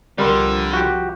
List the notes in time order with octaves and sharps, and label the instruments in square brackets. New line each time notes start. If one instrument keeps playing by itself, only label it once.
[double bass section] C2 F3 [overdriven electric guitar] D3 [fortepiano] G3 A#4 C6
[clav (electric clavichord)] F#4 G4